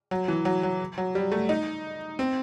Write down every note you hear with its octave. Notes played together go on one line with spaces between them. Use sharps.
F#3
E3
F#3
F#3
F#3
G3
A3
D#4
C4